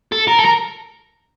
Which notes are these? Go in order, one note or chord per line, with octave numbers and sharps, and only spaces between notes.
A4
A#4
A4
A#4